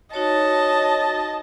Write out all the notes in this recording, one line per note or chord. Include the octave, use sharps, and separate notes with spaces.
D#4 F#4 C#5 D#5 A5